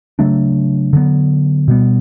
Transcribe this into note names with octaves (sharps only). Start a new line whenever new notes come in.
C#3 F#3 A3 D4
D3 F#3 B3
B2 G3 B3